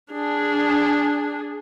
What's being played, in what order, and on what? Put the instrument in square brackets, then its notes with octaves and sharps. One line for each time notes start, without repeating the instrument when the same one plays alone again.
[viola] D4 G#4